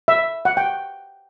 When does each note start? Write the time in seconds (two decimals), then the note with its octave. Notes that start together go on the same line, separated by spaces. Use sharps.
0.08 E5
0.45 F#5
0.57 G5